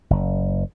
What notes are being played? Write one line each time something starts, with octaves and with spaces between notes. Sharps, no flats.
F#1